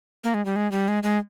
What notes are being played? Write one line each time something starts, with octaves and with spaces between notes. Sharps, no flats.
A#3
G#3
G3
G#3
G3
G#3
G#3